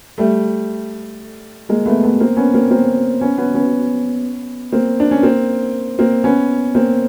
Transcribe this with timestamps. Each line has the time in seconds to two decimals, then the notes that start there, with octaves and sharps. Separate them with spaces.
0.18 G3 A3
1.69 G#3 A#3
1.86 A3 B3
2.03 A3 B3
2.20 A#3 C4
2.37 B3 C#4
2.54 A#3 C4
2.71 A#3 C4
3.21 B3 C#4
3.38 B3 C#4
3.55 B3 C#4
4.72 A#3 C4
5.00 D4
5.11 C#4
5.23 A#3 C4
5.99 A#3 C4
6.24 B3 C#4
6.75 A#3 C4